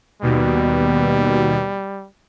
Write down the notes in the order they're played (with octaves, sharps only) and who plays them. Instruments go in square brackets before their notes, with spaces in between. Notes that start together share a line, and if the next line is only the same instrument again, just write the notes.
[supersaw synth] D#2 B2 [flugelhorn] G3